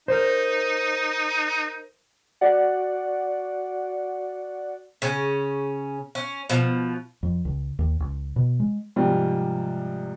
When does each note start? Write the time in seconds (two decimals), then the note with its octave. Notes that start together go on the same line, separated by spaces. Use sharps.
0.08 D#4 A#4 C5
2.41 F#4 D5 F#5
5.02 C#3 C#4
6.15 C#4
6.50 B2 F3
7.23 F2
7.45 C#2
7.79 D#2
8.00 C#2
8.36 B2
8.60 G#3
8.96 G#2 C3 F3 G3 F4